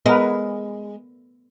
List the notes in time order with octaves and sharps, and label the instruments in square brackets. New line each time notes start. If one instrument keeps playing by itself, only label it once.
[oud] G#3 [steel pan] B3 A#4 B4